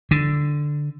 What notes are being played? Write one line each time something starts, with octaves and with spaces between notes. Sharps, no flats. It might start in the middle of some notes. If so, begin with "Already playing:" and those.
D3